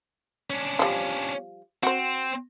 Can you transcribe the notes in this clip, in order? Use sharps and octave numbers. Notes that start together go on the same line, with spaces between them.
C#4 D4
F3 G3
C4 F#4 C5